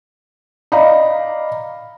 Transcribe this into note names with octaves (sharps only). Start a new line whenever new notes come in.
D5 D#5 F5 A#5 B5